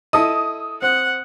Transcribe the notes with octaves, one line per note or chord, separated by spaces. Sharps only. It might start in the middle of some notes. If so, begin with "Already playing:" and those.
E4 A4 D#5 D#6
C4 F#5